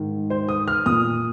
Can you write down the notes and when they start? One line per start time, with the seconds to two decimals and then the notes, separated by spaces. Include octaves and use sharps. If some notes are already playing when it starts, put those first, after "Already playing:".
Already playing: G#2 D#3
0.30 C5
0.49 D#6
0.68 F6
0.86 A#2 D#6